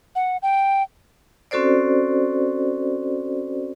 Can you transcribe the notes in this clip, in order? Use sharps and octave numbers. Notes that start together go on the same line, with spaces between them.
F#5
G5
C4 C#4 F#4 A4 C5 D5